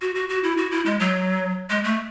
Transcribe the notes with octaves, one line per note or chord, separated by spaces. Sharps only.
F#4
F#4
F#4
E4
F#4
E4
G#3
F#3
G#3
A3